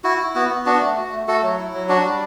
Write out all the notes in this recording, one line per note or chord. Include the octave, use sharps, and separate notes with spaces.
E4 F#4
E4
B3 F#4
B3
D4 F#4
A3
F#4
A3
A3 F#4 A4
F#3
E4
F#3
D4 F#4
G3